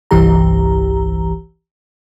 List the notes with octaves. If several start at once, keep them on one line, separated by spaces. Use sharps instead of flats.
G1 C2 G2 E3 G4 A#5